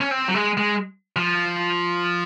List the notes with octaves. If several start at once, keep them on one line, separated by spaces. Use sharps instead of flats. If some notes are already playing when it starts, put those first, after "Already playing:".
C#4
C4
F#3
G#3
G#3
F3